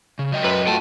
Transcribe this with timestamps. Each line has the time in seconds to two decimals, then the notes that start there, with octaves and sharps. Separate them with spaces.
0.19 C#3
0.32 F#3 D#5 G5
0.44 F#2 B4
0.67 A3 F4 F#4 G5 A5